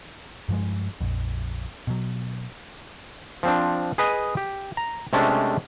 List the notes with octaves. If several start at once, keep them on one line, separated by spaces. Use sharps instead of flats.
G2 F3 G#3
A#1 F2
B2 F#3
F3 C4 D4
G#4 B4 D#5 G#5
G4
A#5
C3 G#3 A3 C#4 D4